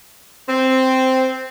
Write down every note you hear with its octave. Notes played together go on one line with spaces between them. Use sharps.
C4